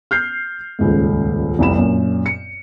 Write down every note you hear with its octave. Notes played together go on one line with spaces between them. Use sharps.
F6 G6 C7
D#1 C#2 G#2
F1 C2 B5 E7
F#2 A#2
C#7